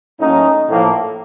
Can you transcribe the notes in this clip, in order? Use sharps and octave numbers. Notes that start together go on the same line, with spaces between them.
A2 F#3 A#3 C#4 D#4
A2 F3 A#3